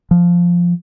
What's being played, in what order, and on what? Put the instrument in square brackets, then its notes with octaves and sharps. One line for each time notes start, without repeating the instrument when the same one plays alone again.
[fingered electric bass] F3